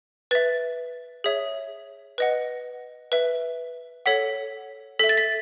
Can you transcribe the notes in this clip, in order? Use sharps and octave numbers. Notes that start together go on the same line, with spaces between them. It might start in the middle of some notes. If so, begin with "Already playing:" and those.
B4 E5 A6
G#4 C#5 E5
B4 D#5 F#5
B4 E5
A4 C#5 F#5 B6
A4 E5 B6
A6
B6